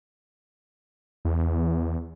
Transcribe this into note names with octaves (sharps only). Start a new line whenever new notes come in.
E2